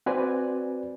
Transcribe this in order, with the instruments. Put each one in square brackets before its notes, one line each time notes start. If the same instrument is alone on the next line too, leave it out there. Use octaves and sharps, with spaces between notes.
[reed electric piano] C4 F#4 B4 C5 D5 G#5